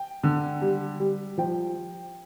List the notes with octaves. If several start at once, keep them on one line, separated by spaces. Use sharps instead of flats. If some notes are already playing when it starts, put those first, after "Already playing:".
Already playing: G5
D3
G3
G3
F3 G5